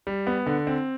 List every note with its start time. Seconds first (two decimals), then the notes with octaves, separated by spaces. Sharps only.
0.07 G3
0.27 B3
0.46 D3
0.67 C4